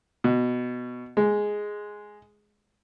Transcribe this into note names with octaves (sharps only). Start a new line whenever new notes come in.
B2
G#3